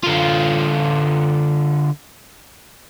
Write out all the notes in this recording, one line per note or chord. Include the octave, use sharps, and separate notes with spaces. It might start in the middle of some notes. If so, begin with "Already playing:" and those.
D3 F4